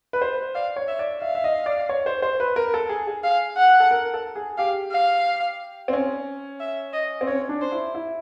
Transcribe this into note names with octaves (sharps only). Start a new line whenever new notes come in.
B4
C5
D5 F5
C#5
E5
D5
E5 F5
E5
D#5
D5
C#5
C5
C5
B4
A#4
A4
G#4
G#4
F5
F#5
A4
A#4
A4
G#4
G4 F5
F5
C4
C#4
E5
D#5
C4
C#4 C#5
D4
C5
E4
E4